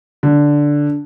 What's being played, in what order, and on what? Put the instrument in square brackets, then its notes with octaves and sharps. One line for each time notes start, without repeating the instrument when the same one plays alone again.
[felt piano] D3